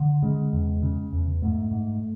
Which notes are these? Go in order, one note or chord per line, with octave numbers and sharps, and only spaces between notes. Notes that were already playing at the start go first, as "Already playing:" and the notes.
Already playing: D3
C#3 G#3
E2
C#3
E2
G#2 A3
G#2